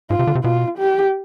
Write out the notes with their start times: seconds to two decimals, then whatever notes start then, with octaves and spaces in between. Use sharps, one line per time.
0.10 G#2 F4
0.19 C3
0.27 D3
0.35 C3
0.44 B2 F4
0.78 G4